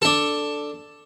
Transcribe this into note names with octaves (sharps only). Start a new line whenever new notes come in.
D4 A4